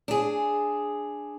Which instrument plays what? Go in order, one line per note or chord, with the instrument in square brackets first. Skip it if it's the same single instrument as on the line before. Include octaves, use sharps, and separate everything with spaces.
[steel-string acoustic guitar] D4 G#4